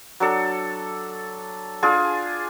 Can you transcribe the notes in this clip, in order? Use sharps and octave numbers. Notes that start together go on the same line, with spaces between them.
F#3 D4 A4
D4 F4 G#4